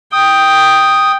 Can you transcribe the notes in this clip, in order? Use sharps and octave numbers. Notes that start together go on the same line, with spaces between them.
G5 D#6